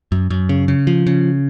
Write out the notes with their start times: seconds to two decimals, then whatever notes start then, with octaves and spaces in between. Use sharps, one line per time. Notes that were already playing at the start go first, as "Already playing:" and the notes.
0.12 F#2
0.30 F#2
0.49 C#3
0.68 C#3
0.87 F3
1.06 C#3